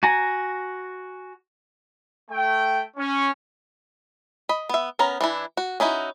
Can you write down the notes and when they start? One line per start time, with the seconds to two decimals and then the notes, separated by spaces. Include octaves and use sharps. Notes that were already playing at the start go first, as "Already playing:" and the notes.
0.03 F#4 G#5 A#5
2.30 A3 G5
2.96 C#4
4.49 D#5 B5
4.69 B3 E5
4.99 B3 C#4 A#4 A#5
5.21 E3 D4 E4
5.57 F#4
5.80 C#4 D#4 E4 F#4